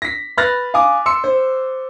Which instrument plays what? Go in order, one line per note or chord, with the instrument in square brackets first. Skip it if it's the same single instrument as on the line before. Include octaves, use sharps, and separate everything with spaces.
[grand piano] A#6 B6
B4 B5 F6 F#6 A6 A#6
F5 G#5 D6 D#6
C6 E6 C#7
C5